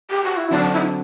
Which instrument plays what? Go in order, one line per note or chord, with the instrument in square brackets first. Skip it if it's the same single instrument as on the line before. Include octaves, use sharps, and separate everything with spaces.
[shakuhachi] G4
F#4
E4
[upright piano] D3 F#3 C4 F#4 [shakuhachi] D4
[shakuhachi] E4
D4